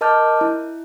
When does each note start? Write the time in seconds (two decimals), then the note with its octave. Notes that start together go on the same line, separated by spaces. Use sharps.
0.01 A#4 D#5 A5 D6 F6 G6
0.41 E4